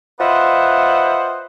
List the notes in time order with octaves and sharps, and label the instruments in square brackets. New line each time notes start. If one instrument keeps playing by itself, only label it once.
[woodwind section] F4 B4 C5 D#5 E5 F#5